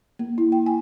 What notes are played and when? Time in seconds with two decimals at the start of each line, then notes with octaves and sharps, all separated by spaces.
0.19 A#3
0.38 E4
0.52 G5
0.66 G#5